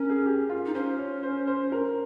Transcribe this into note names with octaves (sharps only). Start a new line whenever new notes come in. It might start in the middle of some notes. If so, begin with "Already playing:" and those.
Already playing: C#4 A#4
G#4
G4
F4
D#4
C#4 C5
C#5
C5
C5
A#4